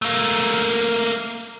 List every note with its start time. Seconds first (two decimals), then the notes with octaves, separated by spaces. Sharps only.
0.02 A3 A#3